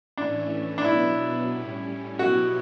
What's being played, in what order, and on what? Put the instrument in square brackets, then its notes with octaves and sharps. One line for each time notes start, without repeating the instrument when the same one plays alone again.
[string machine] A2 E3 A3 C#4 [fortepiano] D4
[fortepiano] D4
[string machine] B2 F#3 B3 [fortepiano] E4
[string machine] A2 G3 C#4
[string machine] B2 F#3 B3 E4 G4 [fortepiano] F#4